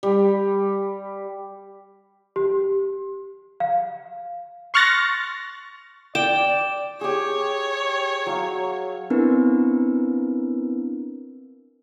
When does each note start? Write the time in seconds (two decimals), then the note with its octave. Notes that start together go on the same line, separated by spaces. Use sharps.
0.03 G3
2.36 G4
3.60 F5
4.74 C6 C#6 F6 F#6 A6 A#6
6.15 D5 G5 E7
7.01 G4 G#4 C#5
8.26 F#3 F5
9.10 B3 C4 D4 E4 A#4 B4